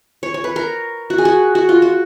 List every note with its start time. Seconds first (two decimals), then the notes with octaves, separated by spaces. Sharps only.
0.23 C#5
0.34 C#5
0.44 B4
0.56 A#4
1.10 F#4
1.18 G#4
1.25 F#4
1.55 F#4
1.69 F4
1.82 F#4